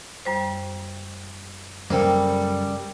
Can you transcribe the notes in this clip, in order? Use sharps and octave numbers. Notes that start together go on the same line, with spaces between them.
F#2 G3 C5
F#2 C#3 G3 A#3 C4 A4 A#4 C5